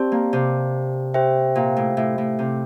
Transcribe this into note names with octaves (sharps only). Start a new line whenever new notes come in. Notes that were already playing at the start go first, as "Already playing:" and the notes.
Already playing: C4 G4 D5 A5
A#3
C3
G4 C5 E5 G5
A#2
A2
A2
A2
C3